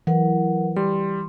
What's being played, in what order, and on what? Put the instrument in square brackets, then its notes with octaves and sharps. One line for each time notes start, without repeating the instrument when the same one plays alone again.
[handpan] E3 [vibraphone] F#3 A#4 F#5
[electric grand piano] G3 [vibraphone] C6